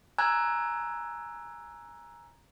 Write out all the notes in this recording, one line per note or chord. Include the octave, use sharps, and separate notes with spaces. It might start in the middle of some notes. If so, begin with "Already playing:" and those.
G#5 A#5 E6 F#6 G#6